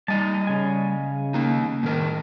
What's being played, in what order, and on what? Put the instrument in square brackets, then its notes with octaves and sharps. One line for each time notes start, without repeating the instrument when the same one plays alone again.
[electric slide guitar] G3 D#5 [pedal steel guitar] D#4 A5
[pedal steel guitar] C#3 G#5
[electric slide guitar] A#3 D#4
A2 D#3 A#4